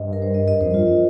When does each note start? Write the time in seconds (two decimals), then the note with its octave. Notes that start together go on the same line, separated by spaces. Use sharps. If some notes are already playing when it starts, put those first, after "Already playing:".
Already playing: G2 D#5
0.13 A#4
0.22 C5
0.34 D#5
0.48 D#5
0.61 F2 C5
0.73 G2 F4
0.87 F4